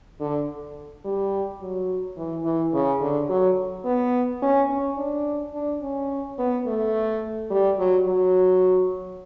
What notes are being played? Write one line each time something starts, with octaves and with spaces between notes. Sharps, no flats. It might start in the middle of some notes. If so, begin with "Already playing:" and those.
D3
G3
F#3
E3
E3
C#3
D3
F#3
B3
C#4
C#4
D4
D4
C#4
B3
A3
G3
F#3
F#3